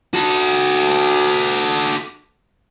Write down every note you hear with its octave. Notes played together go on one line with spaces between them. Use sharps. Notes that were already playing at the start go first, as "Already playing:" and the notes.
F#4 A4